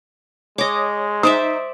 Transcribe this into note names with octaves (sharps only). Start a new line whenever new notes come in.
G#3 C#5 D#5 D6
D#4 C5 D5 E5 D#6